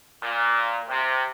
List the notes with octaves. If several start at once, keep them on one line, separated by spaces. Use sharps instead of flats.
A#2
C3